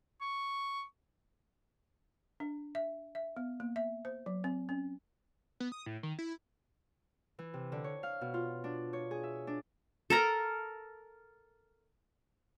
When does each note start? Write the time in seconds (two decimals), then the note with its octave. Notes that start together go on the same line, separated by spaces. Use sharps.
0.21 C#6
2.40 D4
2.75 E5
3.15 E5
3.37 B3
3.60 A#3
3.76 E5
4.05 C5
4.26 F#3
4.44 C4
4.69 C#4
5.60 B3
5.72 D#6
5.86 A2
6.03 D#3
6.19 E4
7.39 E3
7.54 C3
7.72 D3
7.84 C#5
8.03 F5
8.21 B2
8.34 F4
8.64 D4
8.93 C#5
9.11 G#4
9.23 E5
9.47 D4
10.10 A4 A#4 A#5